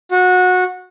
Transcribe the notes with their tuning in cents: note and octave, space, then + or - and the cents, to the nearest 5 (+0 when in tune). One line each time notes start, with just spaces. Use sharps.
F#4 -20